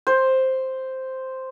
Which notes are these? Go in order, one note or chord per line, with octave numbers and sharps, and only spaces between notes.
C5